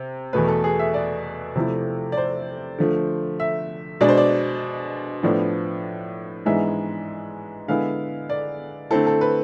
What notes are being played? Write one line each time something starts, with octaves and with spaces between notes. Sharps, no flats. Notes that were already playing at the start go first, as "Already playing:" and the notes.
Already playing: C3
E2 B2 A3 B4
A4
G#4
E5
D5
C3 F3 A3 E4
D5
C5
D3 F3 A3
E5
B2 G#3 D4 D5
C5
D5
A2 F3 B3 D4
G#2 E3 G#3 B3 D4 E5
D3 G#3 B3 E4 F5
D5
D3 A3 C4 E4 A4
A4
B4